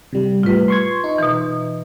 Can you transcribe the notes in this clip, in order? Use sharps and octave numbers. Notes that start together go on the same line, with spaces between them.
C3 G3
A2 G3 F4 B4
C6 C#6 G#6
D#4
B2 E3